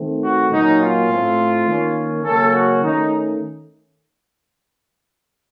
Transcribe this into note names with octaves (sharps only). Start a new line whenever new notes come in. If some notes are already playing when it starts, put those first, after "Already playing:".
Already playing: D#3 A3 C4
F#4
A#2 F#3 A#3 C#4 D#4
F4
A2 A3 C4
D#3 A#3 C#4
C#3 F#3 A#3 C#4 A4
F#4
D#3 A3 C#4 D#4